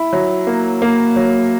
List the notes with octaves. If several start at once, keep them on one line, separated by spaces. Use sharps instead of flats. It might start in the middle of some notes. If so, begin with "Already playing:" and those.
Already playing: E4
F#3
A#3
A#3
F#3